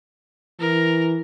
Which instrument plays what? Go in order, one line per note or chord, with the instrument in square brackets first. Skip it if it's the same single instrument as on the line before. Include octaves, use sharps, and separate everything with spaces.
[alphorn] E3 [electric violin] A#4